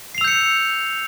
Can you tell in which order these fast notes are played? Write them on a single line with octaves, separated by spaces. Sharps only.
C7 F7 E6 G6 C#7